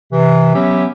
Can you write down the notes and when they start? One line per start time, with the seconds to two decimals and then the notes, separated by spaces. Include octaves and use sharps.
0.12 C3 E3
0.54 F#3 B3 C#4 G4 E5